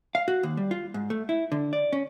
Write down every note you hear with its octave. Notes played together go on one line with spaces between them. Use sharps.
F5
F#4
D#2
G3
F4
G#2
A3
E4
D3
D5
C#4